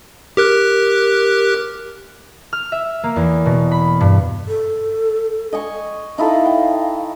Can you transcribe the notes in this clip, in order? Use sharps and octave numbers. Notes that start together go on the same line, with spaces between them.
G4 A#4 F#6
F6
E5
A#3
E2
B2
B5
G2
A4
D#5 G#5 C#6
D#4 E4 A4 F5
G5